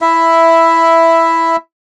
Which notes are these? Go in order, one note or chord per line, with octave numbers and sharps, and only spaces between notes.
E4 E5